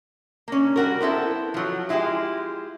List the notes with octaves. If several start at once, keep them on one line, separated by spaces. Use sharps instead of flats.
A#3 C#4
G3 F#4 A#4
B3 C4 E4 A4
F3 F#3
G#3 E4 F4 G4 G#4